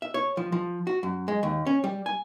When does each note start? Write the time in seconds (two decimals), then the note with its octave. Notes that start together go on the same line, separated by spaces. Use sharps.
0.02 E5
0.14 C#5
0.37 F3
0.52 F3
0.87 F#4
1.03 F#2
1.28 G#3
1.43 D#2
1.67 C#4
1.84 G3
2.06 G#5